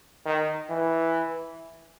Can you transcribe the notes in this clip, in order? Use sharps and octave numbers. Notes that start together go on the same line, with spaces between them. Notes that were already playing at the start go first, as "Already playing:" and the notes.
D#3
E3